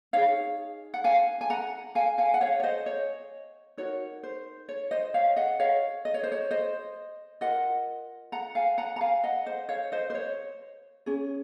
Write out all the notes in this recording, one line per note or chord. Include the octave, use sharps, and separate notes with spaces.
D#4 G#4 C#5 F5
F#5
F5 G#5
G#5
F#5 A#5
F5 G#5
F5 G#5
F#5
C#5 F5
C#5
C5 D#5
C#5
D#4 F#4 A#4 C#5
C5
C#5
C5 D#5
C#5 F5
D#5 F#5
C#5 F5
D#5
C#5
C5
C#5
C5 D#5
F4 A#4 D#5 F#5
F#5 A#5
F5 G#5
F#5 A#5
A#5
F5 G#5
D#5 F#5
C5 D#5
C#5 F5
C5 D#5
C5
C#5
C#4 G#4